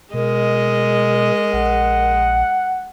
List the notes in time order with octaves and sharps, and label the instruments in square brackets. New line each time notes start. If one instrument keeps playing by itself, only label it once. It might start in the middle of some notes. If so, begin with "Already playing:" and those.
[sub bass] B2 [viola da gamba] G#3 D#5 [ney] A#4
[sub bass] A#1 [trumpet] F#5